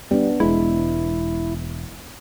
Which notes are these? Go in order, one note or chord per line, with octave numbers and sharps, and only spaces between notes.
G3 B3 D4
E1 G#3 E4